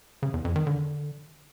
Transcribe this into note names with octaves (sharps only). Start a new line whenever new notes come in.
C#3
E2
F2
D#3
D3